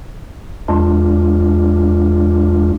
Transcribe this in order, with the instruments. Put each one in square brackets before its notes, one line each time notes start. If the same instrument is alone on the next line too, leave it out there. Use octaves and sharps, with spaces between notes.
[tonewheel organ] E2 G#3 D4 F4